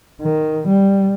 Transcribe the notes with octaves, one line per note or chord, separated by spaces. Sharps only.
D#3
G3